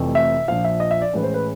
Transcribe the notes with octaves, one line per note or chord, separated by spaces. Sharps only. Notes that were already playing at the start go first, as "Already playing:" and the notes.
Already playing: F1 F2 C3 E3 A3
E5
A#1 A#2 F3 F5
E5
D#5
E5
D5
A2 E3 G#3 C#4 B4
C5
B4